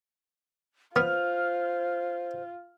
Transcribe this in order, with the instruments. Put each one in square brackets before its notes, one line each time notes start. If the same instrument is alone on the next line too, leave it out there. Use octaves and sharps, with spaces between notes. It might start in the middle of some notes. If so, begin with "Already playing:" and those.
[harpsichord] B3 [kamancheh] F4 [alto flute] C5 [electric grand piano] F6